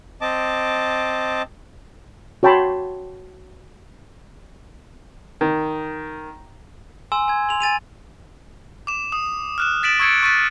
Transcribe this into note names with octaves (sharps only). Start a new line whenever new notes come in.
C4 D#5 A5 D6
F#4 C#5 G5 A5 B5 C6
D#3
G#5 C6 E6 E7
G#5 G#6
C6 F7 F#7
G#5 A6 D#7 F7
D6 E7
D#6
F6 F#6 E7
A6 B6 D7 E7 F#7
C#6 E6 G#6 A6 C#7 D7
C#6 F#6 A6 B6 D#7